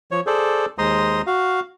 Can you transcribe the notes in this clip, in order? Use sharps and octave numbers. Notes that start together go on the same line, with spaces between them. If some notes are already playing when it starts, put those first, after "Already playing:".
F3 C#5
G#4 A4 C5 D5
D#2 G#3 C5 A#5 C6 D#6
F#4 F5